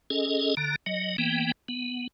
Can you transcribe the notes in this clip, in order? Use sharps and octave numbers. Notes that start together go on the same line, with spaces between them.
C#4 G#4 A4 D#5
D3 A#5
F#3 D#5
E3 A#3 B3 G5
B3